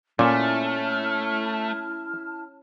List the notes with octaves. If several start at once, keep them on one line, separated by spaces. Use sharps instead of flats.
A#2 A3 C#4 E4 A5 F6